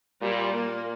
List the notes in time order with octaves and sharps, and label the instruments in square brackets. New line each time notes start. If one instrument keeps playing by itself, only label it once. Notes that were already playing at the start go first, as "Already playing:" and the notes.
[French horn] A#2 [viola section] G3
[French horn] A#2 [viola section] A#3